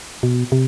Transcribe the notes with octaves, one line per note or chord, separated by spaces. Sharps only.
B2
C3